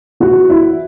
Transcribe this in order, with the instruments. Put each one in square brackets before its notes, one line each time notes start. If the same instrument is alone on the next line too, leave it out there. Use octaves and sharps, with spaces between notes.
[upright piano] E3 F#4
E4